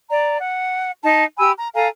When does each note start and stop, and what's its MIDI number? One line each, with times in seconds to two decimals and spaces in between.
0.10 0.37 74
0.10 0.37 82
0.40 0.94 78
1.03 1.24 63
1.03 1.24 81
1.38 1.50 67
1.38 1.50 80
1.38 1.50 83
1.38 1.50 88
1.58 1.68 82
1.74 1.88 69
1.74 1.88 77
1.74 1.88 80
1.74 1.88 82